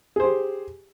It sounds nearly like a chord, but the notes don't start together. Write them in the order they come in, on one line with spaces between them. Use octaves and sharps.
G#4 C5 G4